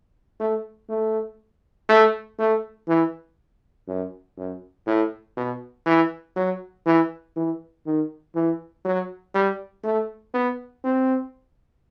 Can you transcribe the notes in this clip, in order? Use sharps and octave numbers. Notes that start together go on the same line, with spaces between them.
A3
A3
A3
A3
E3
F#2
F#2
A2
B2
E3
F#3
E3
E3
D#3
E3
F#3
G3
A3
B3
C4